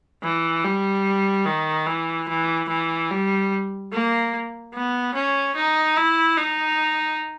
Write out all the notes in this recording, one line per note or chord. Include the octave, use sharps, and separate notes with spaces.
E3
G3
D#3
E3
E3
E3
G3
A#3
B3
C#4
D#4
E4
D#4